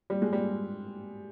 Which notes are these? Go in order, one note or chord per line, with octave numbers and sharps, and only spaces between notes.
G3
G#3
G3